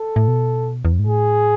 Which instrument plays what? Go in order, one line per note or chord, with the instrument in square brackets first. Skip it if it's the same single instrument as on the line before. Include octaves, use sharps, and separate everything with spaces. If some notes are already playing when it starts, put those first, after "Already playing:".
Already playing: [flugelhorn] A4
[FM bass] A2
B2
E2
F2
G#2
[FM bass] A2 [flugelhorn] G#4